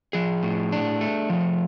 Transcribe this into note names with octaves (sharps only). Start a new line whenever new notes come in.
F3 G#4
A2
D4
A3
F3